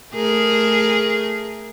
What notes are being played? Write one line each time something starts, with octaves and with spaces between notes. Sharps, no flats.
A3 G#4 A#4